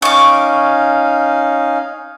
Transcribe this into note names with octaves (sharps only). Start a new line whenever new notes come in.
C#4 D#4 F5 C#6 D6